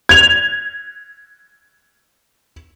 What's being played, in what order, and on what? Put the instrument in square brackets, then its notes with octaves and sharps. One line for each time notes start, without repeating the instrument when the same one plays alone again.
[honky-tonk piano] G#6 F7